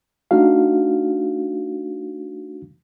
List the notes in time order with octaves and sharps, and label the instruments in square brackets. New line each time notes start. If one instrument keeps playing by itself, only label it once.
[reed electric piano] A3 D4 D#4 F#4 F5